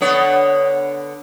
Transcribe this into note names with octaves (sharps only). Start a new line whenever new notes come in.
D3 B3 C#5